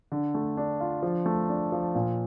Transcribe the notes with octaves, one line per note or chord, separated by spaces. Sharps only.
D3
A3
D4
F4
F3
A3
D4
F3
A#2